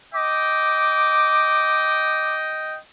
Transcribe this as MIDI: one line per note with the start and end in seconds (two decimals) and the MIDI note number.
0.14 2.78 75
0.14 2.78 79
0.14 2.35 86